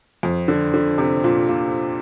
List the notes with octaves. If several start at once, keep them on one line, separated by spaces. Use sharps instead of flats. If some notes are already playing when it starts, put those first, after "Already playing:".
F2
D3
D3
C3
A#2
A#2